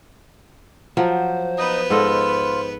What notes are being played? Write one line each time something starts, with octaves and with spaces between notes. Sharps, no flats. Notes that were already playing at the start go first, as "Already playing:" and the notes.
F3 F#3 C5
B3 D#4 B4 D#5 D#6
G#2 F4 A4 D#5